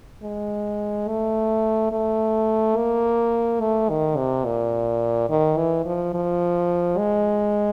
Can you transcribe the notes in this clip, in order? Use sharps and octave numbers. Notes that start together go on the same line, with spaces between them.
G#3
A3
A3
A#3
A3
D#3
C3
A#2
D#3
E3
F3
F3
G#3